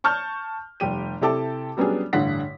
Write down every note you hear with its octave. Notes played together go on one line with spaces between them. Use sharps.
A5 C#6 F6 G6
F1 G3 G4 D#7
C3 E4 G4 A4 A5 D6
F#3 G3 B3 C#4 D4 G#4
A1 G2 D3 F#5 B6